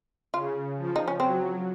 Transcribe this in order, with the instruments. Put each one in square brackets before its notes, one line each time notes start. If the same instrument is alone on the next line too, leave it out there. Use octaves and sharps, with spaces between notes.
[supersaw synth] C#3 [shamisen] F4
[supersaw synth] F3
[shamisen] D#4
C#4
[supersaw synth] F#3 [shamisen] C4